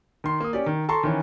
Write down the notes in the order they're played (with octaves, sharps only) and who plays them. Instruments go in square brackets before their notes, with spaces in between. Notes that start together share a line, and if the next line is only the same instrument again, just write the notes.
[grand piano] D#3 C6
A#3 D#6
C#4 G4 D5
D#3
A4 A5 A#5 C6 C#6
D#3 E3 C#4